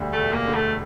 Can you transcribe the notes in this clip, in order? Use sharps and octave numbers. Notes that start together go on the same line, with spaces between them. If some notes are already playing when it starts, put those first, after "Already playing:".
Already playing: E1 D2 D3 G3
A3
E1
A#3
D3
A3